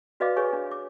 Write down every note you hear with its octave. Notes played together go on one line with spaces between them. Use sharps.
F#4 B4 D5 D#5 F5 D6
G#4 B4 C#5 G#5 C#6
D4
D6